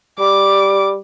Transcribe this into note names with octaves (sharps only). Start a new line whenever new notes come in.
G3 D6